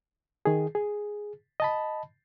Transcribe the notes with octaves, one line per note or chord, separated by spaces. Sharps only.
D#3 G#4
G#4
D#5 A5 B5